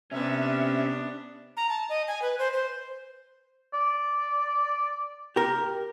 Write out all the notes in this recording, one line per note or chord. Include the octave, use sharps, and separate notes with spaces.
C3 B3 C#4 D4 E5
A#5
A5
D#5
G#5
B4
C5
C5
D5
G4 A#4